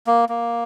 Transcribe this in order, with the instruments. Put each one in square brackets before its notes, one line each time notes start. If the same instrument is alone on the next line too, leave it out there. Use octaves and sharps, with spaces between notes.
[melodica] A#3
A#3